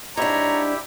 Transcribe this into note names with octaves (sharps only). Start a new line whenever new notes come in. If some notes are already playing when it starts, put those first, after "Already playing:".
G#2 D4 E4 G4 C#5 A#5